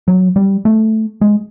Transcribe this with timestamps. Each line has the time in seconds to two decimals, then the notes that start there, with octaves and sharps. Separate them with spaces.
0.08 F#3
0.36 G3
0.65 A3
1.21 G#3